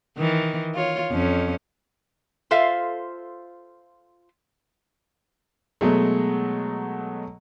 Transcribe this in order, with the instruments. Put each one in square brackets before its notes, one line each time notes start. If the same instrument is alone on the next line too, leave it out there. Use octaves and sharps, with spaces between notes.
[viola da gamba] D#3 E3
F4 C#5
F2 C#4
[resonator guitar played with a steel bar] F4 A4 C5 E5 F5
[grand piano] B2 F#3 G#3 A3